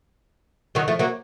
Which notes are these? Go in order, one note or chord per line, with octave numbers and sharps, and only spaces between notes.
D#3 F#3
F3 A3
F#3 A#3